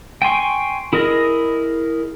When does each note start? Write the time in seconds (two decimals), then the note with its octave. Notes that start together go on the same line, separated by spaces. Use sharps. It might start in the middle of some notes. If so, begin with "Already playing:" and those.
0.22 G5 G#5 C6 C#6
0.93 E4 G#4 A#4 D#5